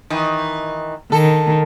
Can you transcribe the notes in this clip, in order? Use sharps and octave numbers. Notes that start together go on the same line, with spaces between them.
D#3 E3
D#3 A4